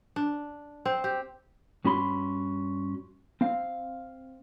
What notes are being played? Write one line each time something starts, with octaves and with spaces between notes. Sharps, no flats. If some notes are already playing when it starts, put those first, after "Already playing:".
D4
C4
G4
G2 C#4 F#4 B5 C6
C4 F5